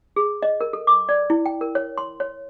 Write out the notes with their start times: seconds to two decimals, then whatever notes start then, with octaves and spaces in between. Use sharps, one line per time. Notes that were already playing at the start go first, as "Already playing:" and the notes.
0.16 G#4
0.42 D#5
0.61 A#4
0.73 A4
0.87 D6
1.09 D5
1.30 E4
1.46 G5
1.61 A#4
1.75 C#5
1.98 C6
2.20 C#5